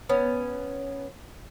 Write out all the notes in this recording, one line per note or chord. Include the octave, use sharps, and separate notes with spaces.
B3 C#4